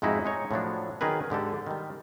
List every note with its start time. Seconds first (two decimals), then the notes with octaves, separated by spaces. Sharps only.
0.02 F2 G#2 G#3 D#4 E4 F#4
0.25 G#3 D#4 C#5
0.51 A2 F3 F#3 D4
1.01 D#3 F#3 G#4 A#4 B4
1.30 G#2 D3 G4 A4
1.67 D#3 G3